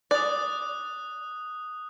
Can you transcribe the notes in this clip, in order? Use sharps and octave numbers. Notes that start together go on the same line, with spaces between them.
D5 D#6 F#6